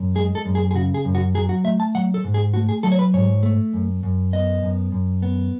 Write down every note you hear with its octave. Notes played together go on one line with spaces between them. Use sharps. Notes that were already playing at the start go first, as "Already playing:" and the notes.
Already playing: F#2
G#3 G#4
A4
F#2
G#4
G#4
C#3 F#4
G#4
F#2
F#4
F#3 G#4
F#4
A3 E5
A5
F#3 F#5
A4
G#2
G#4
A3 F#4
G#4
F#3 A4
C#5
B4
G#2 C#5
A3
F#2
F#2
B3 D#5
F#2
F#2
B3